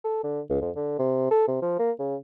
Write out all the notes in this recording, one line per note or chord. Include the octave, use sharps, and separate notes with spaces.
A4
D3
C#2
F2
D3
C3
A4
C3
F3
A#3
C#3